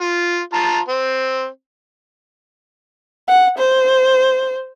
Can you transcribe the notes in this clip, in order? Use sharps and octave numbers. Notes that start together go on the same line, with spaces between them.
F4
F4 A5 A#5
C4
F#5
C5